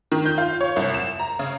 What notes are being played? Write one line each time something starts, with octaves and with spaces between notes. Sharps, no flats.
D#3
G6
F4
C#5
C2
E7
A#5
C#3